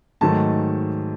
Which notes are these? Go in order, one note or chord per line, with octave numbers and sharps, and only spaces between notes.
G#2 D#3 F#3 A3 A5